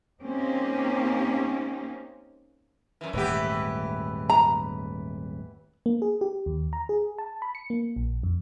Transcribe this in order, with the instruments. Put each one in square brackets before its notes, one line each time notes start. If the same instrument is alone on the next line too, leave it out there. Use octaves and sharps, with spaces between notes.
[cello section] A#3 C4 C#4 D#4 G4
[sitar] F#2 E3
[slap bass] D#1 G#2 A3 [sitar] E3 B3 G4
[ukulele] A#5
[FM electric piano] A#3
G#4
G4
D#2
A#5
G#4
A5
B5
C#7
A#3
A#1
F2